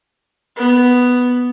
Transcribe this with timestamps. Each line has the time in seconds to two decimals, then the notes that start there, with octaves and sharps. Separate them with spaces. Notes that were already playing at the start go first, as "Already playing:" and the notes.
0.56 B3